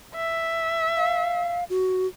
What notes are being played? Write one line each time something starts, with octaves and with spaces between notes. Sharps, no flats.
E5
F5
F#4